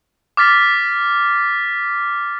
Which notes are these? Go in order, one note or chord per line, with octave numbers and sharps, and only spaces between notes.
D6 F6 A6 B6